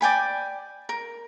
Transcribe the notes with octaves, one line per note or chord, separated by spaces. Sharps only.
D5 G5 G#5 B5
A#4